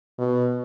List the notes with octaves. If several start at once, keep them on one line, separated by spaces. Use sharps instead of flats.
B2